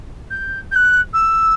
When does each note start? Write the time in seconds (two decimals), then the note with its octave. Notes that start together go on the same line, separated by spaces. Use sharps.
0.31 G6
0.72 G6
0.75 F#6
1.13 E6